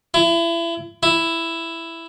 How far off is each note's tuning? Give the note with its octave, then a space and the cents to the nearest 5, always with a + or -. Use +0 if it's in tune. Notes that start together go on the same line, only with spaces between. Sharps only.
E4 +30
E4 +5